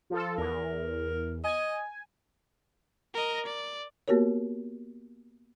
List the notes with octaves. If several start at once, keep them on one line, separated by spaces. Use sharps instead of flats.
F3 F4 A4
E2 A#4
D#5 G#5
A#4 D#5
D5
A#3 B3 F#4 G4 A#4 C#5